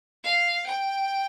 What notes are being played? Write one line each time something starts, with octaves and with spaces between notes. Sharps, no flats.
F5
G5